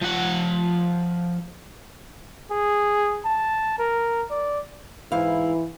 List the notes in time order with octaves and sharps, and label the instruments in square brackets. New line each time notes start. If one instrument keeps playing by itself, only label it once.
[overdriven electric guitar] F3 F#5
[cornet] G#4
A5
A#4
D5
[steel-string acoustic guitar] G#2 E4 F5 [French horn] E3